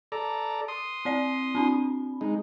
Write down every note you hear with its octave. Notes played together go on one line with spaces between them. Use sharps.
A4 D5 A#5
C6 D#6
C4 D5 C7
C4 D4 B5
G#3 D#4